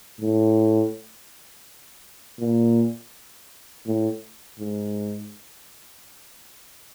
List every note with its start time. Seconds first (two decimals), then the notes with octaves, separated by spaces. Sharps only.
0.21 A2
2.40 A#2
3.87 A2
4.60 G#2